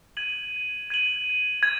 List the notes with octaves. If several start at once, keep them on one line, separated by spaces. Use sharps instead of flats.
G#6 D#7 F#7
G#6 D#7 F#7
G#6 D#7